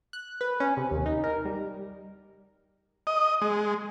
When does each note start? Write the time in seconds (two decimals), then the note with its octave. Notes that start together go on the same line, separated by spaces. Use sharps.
0.13 F#6
0.41 B4
0.60 C#4
0.77 C3
0.91 D#2
1.06 D#4
1.24 A#4
1.45 G3
3.07 D#5
3.42 G#3